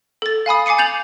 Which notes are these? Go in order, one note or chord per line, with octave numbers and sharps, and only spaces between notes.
A4 A6
F5 G#5 B5 D#6
G#5 D6 C7 C#7 D#7
G6 A6 F7 F#7